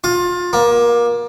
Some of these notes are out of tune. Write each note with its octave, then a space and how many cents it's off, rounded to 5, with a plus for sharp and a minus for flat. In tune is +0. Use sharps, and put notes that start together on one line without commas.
F4 +25
A#3 +25